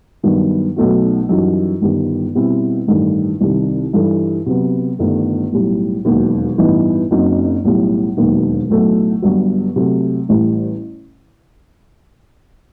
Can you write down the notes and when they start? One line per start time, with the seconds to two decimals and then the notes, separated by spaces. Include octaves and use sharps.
0.23 G2 D#3 F#3 B3
0.76 B1 B2 A3 D#4 F#4
1.29 F#2 E3 G3 D#4 F#4
1.81 G1 G2 D#3 G3
2.35 B2 G3 C4 E4
2.87 A1 G2 D#3 A3
3.41 C2 C3 D#3
3.93 G2 E3 G3 D#4 A4
4.46 C3 F#3 B3
4.99 G1 G2 D#3 A3
5.53 B1 A2 G3
6.05 E1 D#2 D#3 F#3
6.58 A1 G2 E3 B3 D#4
7.11 F#1 F#2 F#3 C4 D#4
7.64 B1 A2 G3
8.17 E1 D#2 D#3 F#3
8.70 B1 A2 F#3 A3
9.22 G1 G2 F#3
9.76 C3 F#3 A3
10.29 A1 A2 G3